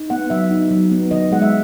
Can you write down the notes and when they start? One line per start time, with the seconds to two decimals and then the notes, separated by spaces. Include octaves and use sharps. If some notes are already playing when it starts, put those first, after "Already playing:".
Already playing: D#4
0.10 B3 F#5
0.30 F#3 E5
0.51 D#4
0.71 F#3
0.91 B3
1.11 D#3 D#5
1.32 G#3 F#5
1.42 E5